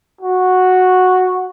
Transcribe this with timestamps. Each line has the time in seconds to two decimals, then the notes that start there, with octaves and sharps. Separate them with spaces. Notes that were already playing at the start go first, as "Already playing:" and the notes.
0.21 F#4